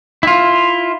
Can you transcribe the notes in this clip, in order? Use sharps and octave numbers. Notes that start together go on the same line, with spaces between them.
E4 F4